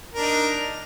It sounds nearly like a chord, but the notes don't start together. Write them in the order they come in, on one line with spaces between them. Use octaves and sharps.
A#4 D4 D#4